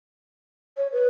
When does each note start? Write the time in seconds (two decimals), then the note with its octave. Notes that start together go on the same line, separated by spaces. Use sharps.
0.77 C#5
0.93 B4